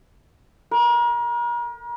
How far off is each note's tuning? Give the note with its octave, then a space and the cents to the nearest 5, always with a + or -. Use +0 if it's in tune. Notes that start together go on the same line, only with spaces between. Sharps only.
A#4 +40